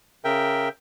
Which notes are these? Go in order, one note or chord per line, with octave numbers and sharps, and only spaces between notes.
C#3 A#4 E5 G5